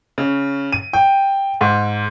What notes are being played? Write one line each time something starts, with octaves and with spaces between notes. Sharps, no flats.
C#3
D#7
G5
G#2